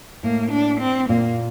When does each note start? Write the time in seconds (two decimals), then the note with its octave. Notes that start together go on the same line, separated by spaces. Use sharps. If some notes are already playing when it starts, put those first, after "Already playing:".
0.23 A2 A#3
0.51 D4
0.80 C4
1.08 A#2 A#3